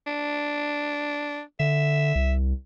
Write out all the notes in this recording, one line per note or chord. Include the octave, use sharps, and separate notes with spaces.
D4
D3 E5
C2